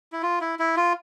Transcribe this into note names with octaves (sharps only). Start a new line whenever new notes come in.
E4
F4
E4
E4
F4